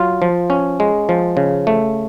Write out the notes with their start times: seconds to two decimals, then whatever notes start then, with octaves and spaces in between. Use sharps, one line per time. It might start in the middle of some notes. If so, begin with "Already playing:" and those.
Already playing: F#3 F4
0.22 F3
0.50 C#4
0.80 G#3
1.09 F3
1.37 C#3
1.67 A3